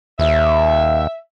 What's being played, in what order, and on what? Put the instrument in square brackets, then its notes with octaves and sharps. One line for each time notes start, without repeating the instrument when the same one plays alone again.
[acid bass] D#2 [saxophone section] E5